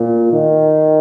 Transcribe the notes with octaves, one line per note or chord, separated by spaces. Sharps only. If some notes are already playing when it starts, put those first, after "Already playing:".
Already playing: A#2
D#3